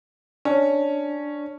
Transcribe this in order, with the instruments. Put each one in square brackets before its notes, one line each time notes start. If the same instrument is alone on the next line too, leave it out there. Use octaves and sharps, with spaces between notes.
[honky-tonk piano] C#4 [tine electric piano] D4